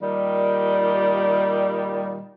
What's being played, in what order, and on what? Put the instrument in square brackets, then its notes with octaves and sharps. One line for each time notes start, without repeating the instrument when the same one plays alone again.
[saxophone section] A#2 D#3 G3